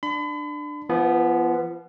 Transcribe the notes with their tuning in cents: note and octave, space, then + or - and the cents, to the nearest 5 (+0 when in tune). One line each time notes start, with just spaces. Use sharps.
D4 +15 B5 +40
F3 -35 B3 +0